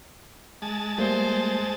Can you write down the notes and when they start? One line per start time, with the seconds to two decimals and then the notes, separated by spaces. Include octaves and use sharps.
0.62 G#3 A5
0.98 G3 A3 A#3 C5